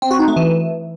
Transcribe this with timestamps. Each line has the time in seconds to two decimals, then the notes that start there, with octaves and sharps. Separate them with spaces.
0.02 C4
0.11 F#4
0.19 D#4
0.28 A3
0.36 E3